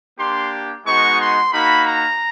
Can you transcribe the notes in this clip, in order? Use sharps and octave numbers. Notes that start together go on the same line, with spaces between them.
A#3 D4 G4 C6
G#3 B3 D#4 F#4 C#6
C6
A#3 D#4 F#4 B5
A#5